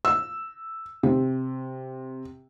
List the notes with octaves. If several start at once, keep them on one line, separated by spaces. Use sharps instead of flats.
E6
C3